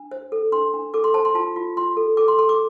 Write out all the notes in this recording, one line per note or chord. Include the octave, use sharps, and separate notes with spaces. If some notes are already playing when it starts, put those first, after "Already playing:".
Already playing: D4
C5
A4
D4 C6
D4
A4 D6
C6
C5 A5
C6
F4 A5
F4
F4 C6
A4
A4 D6
C6
A4 C6
D6